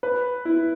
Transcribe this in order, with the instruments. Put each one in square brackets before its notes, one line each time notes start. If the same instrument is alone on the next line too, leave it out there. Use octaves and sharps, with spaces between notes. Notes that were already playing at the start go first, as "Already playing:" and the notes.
[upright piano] B4
E4